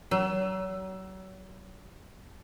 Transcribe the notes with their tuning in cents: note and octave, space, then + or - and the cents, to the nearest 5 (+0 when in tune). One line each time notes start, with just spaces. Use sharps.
F#3 +35